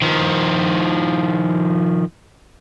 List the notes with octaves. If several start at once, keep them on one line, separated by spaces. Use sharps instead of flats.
D#3 F3